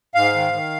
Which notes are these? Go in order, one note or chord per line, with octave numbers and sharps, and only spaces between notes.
G#2 F5
D#3
D#3